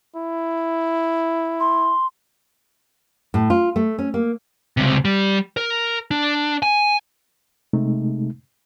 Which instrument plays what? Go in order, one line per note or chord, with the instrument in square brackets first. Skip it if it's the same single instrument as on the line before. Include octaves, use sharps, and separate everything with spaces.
[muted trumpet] E4
[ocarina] C6
[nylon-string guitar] A2
F4
A3
C#4
A#3
[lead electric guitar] C#2 C3
G3
A#4
D4
G#5
[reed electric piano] C3 G#3 A3 D#4